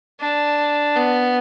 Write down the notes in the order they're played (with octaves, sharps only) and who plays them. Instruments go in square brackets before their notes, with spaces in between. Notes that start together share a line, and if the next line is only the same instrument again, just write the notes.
[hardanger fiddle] D4
B3